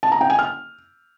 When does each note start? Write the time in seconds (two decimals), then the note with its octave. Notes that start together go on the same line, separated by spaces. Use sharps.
0.03 A5
0.12 A#5
0.21 G5
0.30 G#5
0.39 F6